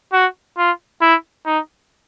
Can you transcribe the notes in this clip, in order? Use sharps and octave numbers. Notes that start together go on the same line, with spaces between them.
F#4
F4
E4
D#4